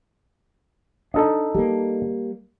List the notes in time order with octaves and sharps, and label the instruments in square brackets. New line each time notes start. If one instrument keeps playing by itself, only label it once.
[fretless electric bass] D4 [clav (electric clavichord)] D#4 A4 D#5
[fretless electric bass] G3 A#3